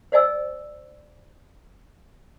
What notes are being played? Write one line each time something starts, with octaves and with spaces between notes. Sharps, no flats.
C5 D5 D#5 G#5 E6